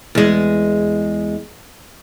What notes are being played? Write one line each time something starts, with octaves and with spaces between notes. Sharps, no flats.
E2 G#3